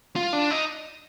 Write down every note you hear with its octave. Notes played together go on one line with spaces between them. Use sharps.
F4
D4
D#4